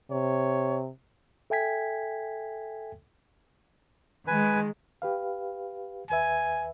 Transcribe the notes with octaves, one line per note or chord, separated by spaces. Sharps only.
C3 C#5
A4 E5 G5 G#5 G#6 B6
D#3 G#3 B4 G#5
G4 B4 F5
D#2 B4 E5 G#5